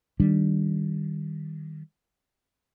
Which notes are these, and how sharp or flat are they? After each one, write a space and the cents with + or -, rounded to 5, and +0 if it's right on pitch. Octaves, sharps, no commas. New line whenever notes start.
D#3 +0 G3 +0 D4 +0